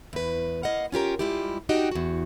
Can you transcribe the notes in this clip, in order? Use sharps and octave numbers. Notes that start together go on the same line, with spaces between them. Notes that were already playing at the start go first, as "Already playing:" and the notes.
E2 B4
A#3 D#5 F5 F#5
C#4 F4 G4 A#4
G3 G#3 E4 F4 G4
D4 D#4 F#4 G4 D#5 G5
E2 F#4